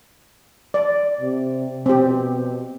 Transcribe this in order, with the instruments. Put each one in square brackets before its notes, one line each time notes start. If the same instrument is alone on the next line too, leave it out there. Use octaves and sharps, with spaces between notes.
[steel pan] D5
[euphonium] C3
[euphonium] B2 [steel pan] C4 G4